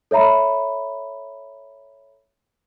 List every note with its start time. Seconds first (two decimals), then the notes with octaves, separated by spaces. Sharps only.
0.11 A4 C#5 E5 A#5 B5